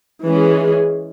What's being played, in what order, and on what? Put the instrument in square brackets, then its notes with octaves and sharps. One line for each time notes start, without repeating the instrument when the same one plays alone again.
[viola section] E3 G#3 C#4 G#4